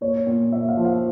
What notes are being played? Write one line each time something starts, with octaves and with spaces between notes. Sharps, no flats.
A#2 C#5
A#2
A#2 E5
F5
F3
F5